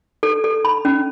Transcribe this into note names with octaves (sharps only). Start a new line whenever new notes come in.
A4
A4
B5
C#4